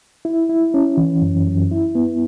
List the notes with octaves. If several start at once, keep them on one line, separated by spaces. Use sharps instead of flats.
E4
E4
C#4
E3
F#2
F#2
E4
B3